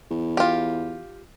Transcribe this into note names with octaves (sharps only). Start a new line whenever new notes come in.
E2
F4 G4